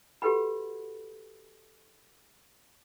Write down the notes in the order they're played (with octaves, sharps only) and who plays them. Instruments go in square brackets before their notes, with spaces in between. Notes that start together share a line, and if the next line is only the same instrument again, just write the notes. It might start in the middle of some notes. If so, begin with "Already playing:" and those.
[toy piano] F#4 G4 A4 B4 F#5 B5